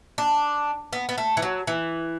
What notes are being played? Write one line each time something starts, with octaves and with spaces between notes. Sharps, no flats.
D4
B3
B3
A3
E3
F#3
E3